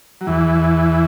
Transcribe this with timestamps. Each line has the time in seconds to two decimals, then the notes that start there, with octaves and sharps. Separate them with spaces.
0.21 F#3
0.27 E2 E3